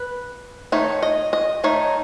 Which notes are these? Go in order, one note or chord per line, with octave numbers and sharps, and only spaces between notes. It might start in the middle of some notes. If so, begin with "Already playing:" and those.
Already playing: B4
D#3 A3 D#4 C#5
D#5
D#5
D#3 A3 D#4 C#5